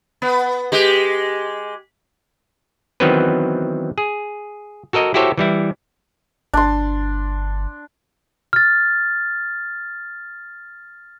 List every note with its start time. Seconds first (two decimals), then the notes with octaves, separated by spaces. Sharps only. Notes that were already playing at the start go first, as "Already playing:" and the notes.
0.22 B3
0.72 G#3 G4
3.00 D#3 E3 F#3 B3 C4 B4
3.98 G#4
4.93 F#4 A4 A#4 D#5
5.14 E4 F#4 G4 A4 C5 C#5
5.38 E3 G3 E4
6.54 G1 D4 C6
8.53 F6 A6